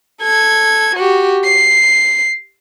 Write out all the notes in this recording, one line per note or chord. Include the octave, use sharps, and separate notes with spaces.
A4 G#6
F#4 G4
C7